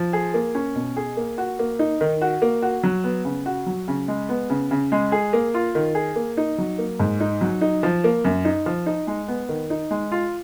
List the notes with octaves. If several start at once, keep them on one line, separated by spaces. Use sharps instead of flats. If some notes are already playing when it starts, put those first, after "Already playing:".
Already playing: F3
G#4
A#3
C#4
B2
G#4
A#3
F#4
A#3
D#4
D#3
F#4
A#3
F#4
F#3
B3
C#3
F#4
F#3
C#3
G#3
B3
C#3
C#3
G#3
G#4
A#3
F4
D#3
G#4
A#3
D#4
F#3
A#3
G#2
D#4
F#3
D#4
F3
A#3
F#2
D#4
F3
D#4
G#3
B3
D#3
D#4
G#3
F4